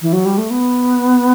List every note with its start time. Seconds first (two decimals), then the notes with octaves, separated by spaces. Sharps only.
0.00 E3
0.13 F#3
0.26 G3
0.38 A3
0.50 B3